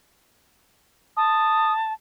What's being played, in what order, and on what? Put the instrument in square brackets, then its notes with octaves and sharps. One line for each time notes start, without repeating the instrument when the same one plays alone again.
[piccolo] A5 [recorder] D#6